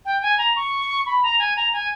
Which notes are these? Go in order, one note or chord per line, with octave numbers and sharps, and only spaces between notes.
G5
G#5
A#5
C#6
B5
A#5
G#5
A#5
G#5